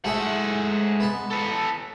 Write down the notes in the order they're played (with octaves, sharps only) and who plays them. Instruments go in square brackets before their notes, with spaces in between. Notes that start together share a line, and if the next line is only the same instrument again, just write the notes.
[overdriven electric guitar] G#3 F#5 [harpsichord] A3 G#4 E5
[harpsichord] B3 A5
[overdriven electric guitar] A4 B4